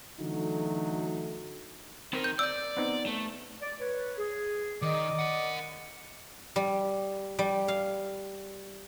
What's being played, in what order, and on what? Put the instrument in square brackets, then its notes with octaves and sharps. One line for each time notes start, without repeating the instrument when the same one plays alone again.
[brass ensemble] D3 E3 F#3 A3 D#4 F#4
[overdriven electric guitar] D#3 A#4 [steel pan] C4 B5
[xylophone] G6
[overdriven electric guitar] D5 [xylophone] E6 G6
[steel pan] B3 C4 D#4
[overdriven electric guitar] A3
[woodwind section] D5
B4 C#5
G#4
[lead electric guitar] D#3 [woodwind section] D5 D#5 D6
[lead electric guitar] A#4 F#5
[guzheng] G3
G3
F5